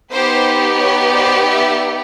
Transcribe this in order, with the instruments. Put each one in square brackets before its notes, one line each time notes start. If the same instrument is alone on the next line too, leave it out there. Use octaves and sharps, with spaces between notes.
[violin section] B3 D#4 G4 C5
B4 C#5
C5 D5
D5 E5